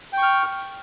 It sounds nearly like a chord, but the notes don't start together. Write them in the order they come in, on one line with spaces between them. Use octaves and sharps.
G5 C#6 F6